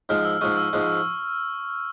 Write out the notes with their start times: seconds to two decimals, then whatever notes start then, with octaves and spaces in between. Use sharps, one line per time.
0.09 G#2 F3 G#3 F6
0.25 E6
0.41 G#2 F3 G#3 C#6
0.57 E6
0.73 G#2 F3 G#3